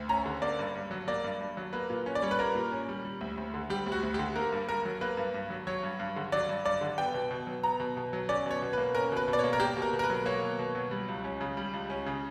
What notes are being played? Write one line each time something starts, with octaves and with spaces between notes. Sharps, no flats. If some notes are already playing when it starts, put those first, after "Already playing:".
Already playing: D2
C#4 A#5
D3
A#3 D5
G2
G2
F#3
A#3 D5
G2
G2
F#3
A#3 B4
A#2
C#4
D5
G3 C#5
B4
A#3 A#4
A#2
C#4
G3
G3
D2
D2
D3
G3 G4
D2
F#4
D2
G4
D3
A#3 A#4
G2
G2 A#4
F#3
A#3 B4
G2
G2
F#3
F#3 C#5
G2
G2
D3
F#3 D5
G2
G2 D5
D3
B3 G5
B2
B2
F#3
B3 A#5
B2
B2
F#3
C#4 D5
B2 C#5
B2
B4
A#3
C#4 A#4
B2 B4
B2
D5
C#5
A#3
A#4
A#3 G4
B2
A#4
B2
A#4
B4
F#3
A#3 C#5
B2
B2
F#3
G3
C#2
C#4
C#3
G3
C#2
C#4
C#3